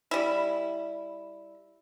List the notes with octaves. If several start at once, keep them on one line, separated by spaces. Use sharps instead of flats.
G3 E4